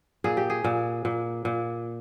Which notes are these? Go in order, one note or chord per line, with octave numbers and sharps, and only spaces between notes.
A#2 G#4
G4
G#4
A#2
A#2
A#2